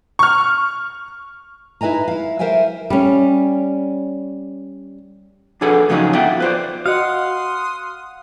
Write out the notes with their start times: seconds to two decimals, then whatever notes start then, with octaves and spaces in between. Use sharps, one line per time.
0.19 C#6 F6
1.81 D#4 E4 B4 D#5 G#5 A#5
2.08 E4 F5
2.39 A#4 C5 E5 F5 G5 G#5
2.90 G3 C#4
5.61 F2 D4 G#4 A4 B4 F#5
5.89 G#2 C#3 F3 F#3 D#4 G#4
6.14 B3 F4 E5 F#5 G5
6.40 B4 C5 D5
6.86 F#4 D#5 F5 F#5 C6 D#6